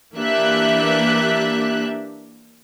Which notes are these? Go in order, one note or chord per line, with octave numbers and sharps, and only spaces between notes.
E3 A#3 D4 G4 E5 F#6